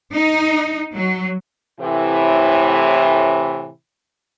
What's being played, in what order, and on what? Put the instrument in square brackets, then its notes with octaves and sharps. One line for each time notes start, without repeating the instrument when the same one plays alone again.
[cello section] D#4
F#3
[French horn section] A2 C3 E3